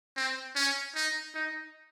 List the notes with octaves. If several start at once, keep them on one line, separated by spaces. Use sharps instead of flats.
C4
C#4
D#4
D#4